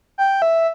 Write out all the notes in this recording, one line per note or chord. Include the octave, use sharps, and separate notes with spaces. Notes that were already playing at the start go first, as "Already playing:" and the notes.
G5
E5